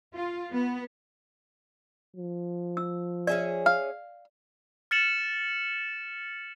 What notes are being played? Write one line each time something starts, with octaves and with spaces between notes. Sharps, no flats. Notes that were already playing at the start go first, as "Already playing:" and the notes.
F4
B3
F3
E6
C#4 G#4 D5 E5
F5
F6 A6 C#7 E7 F#7